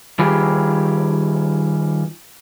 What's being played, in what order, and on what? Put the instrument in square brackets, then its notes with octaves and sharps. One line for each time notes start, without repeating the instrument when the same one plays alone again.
[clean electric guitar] D#3 G3 F4 G4 G#4 B4